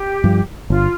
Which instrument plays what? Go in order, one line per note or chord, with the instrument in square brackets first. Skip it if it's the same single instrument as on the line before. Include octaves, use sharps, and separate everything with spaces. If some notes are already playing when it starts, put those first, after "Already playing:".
Already playing: [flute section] G4
[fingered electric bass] G2 F3
[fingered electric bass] G1 [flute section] F4